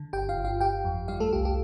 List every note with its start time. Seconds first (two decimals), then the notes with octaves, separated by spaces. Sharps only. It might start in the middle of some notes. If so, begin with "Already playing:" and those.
Already playing: D3
0.13 G1 G4 G5
0.29 F4 F5
0.36 G1
0.45 F4 F5
0.60 G1 G4 G5
0.85 F2
1.08 G3 F4 F5
1.20 A3 A4
1.33 C2 G4
1.45 G4